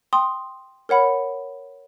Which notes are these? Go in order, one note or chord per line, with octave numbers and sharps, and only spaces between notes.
G5 C6 D#6
A#4 C#5 F#5 B5